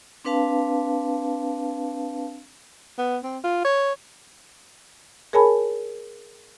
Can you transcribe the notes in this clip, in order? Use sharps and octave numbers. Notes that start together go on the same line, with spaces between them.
C4 D4 B4 F5 A5
B3
C4
F4
C#5
G#4 A#4 C#5 G#5 A5 B5